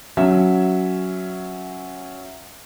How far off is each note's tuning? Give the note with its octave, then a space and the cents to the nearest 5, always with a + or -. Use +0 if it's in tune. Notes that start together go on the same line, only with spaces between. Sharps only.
F#3 +0 C#4 +0 E5 +0